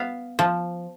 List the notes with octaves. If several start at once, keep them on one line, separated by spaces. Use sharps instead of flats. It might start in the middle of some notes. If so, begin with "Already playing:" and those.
Already playing: B3 F5
F3